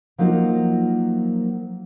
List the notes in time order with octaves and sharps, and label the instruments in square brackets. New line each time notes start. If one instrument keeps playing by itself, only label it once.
[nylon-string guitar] F3 F#3 A#3 D#4 F4